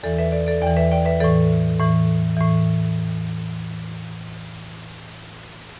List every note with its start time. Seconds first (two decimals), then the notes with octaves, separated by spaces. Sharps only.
0.03 E2 E3 A4 D5
0.19 B4 E5
0.32 A4 D5
0.47 A4 D5
0.62 E2 D5 G5
0.66 E3
0.77 B4 E5
0.92 D5 G5
1.05 B4 E5
1.20 A2 E3 A4 D5
1.80 A2 E3
2.37 A2 E3